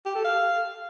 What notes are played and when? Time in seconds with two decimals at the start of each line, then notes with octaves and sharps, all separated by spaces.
0.06 G4
0.15 A4
0.25 F5